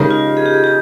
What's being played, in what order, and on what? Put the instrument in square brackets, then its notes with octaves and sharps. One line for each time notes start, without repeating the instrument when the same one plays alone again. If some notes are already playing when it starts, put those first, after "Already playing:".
Already playing: [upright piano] C#3 G#3 D#4 A#4 [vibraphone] G4
[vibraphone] F4
G#4
G4
G#4
G4